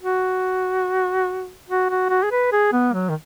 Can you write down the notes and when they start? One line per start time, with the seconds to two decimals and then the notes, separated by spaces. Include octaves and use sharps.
0.02 F#4
1.68 F#4
1.90 F#4
2.10 F#4
2.23 G#4
2.31 B4
2.52 G#4
2.73 B3
2.93 F#3
3.09 D#3